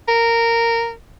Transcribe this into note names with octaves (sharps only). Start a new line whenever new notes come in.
A#4